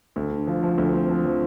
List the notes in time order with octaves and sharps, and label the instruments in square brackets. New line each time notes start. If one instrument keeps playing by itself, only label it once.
[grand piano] D2
D3
F3
F3
D2
C4
F3
F3